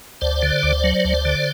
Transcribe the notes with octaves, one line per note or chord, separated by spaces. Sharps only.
D2 C5 D5
D3
D2
F#3
D2
D3